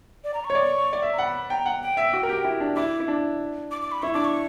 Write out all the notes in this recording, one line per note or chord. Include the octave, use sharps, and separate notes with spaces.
D5
A#5
C#6
C#5
D5
D5
E5
A#5
F#5 B5
G5 A#5
F#5
G5
E5
F#4
A#4
G4
E4
D4
E4 D6
E4
D4
D6
D6
B5
E4 C#6
D4 D6
C#6